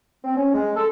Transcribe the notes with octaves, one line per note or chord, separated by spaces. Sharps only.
C4
C#4
G#3
A4